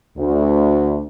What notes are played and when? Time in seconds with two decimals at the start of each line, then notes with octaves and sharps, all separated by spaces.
0.17 D2